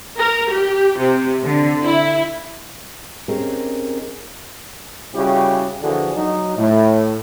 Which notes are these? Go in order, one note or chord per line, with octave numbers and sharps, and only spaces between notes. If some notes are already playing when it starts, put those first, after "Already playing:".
A#4
G4
C3
D3
E4
C4 C#4 D#4 G4 G#4 A#4
C#3 G3 E4 F#4 G4
D3 E3 F3 A#3 F#4 G#4
F#3 D#4
A2